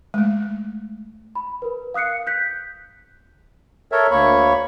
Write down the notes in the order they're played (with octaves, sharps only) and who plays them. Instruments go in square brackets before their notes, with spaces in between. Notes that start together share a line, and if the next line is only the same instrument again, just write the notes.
[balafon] G#3 A3
[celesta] B5
A#4 B4
F5 D#6 F#6 C7 C#7
F#6 G6 B6
[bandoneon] A4 A#4 C#5 E5
D2 A#3 C#5 B5 C#6